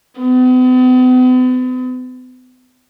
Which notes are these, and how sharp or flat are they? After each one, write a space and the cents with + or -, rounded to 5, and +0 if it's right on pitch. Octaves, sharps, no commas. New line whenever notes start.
B3 +45